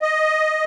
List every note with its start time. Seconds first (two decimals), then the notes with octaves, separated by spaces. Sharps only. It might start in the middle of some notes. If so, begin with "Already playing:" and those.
0.02 D#5